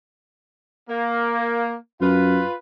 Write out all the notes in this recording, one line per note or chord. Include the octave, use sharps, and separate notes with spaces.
A#3
F#2 F4 B4